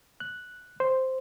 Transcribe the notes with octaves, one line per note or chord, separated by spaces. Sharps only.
F#6
C5